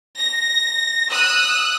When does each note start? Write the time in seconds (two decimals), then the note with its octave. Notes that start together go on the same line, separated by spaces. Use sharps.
0.17 A#6
1.10 D#6 E6 F#6